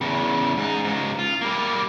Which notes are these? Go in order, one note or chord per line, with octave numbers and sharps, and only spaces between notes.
E2 C#3
G#2 D#4
G#2 C#3
F4
G3 A#3